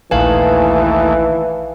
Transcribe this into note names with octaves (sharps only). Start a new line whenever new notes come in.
A#1 D#2 E3 A3 B4 F5 G#5